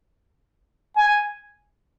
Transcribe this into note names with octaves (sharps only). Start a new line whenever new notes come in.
G#5